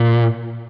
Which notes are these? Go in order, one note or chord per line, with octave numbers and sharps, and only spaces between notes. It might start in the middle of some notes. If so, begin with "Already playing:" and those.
Already playing: A#2